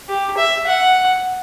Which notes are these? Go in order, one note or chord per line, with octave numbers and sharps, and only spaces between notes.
G4
E5
F#5